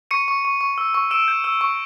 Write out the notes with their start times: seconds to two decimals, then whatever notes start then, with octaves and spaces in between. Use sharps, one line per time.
0.11 C#6 C#7 D#7
0.28 C#6
0.45 C#6
0.61 C#6
0.78 E6
0.94 C#6
1.11 E6 D7 E7
1.28 G6
1.44 E6
1.61 C#6